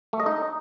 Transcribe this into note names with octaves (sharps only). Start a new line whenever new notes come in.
A3
D#5
D#4